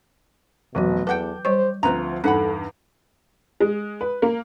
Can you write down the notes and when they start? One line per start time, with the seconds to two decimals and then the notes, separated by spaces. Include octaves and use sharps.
0.75 F1 B2 E3 F#3 F#4
1.07 E2 A4 B4 F#5 G5 D6 G6
1.45 G3 G4 C5 C#5 C#6
1.83 D2 F3 C4 F4 B4 A#5
2.24 E2 G2 D#4 A4 B4 F#5 B5
3.60 G#3
4.01 B4
4.22 A#3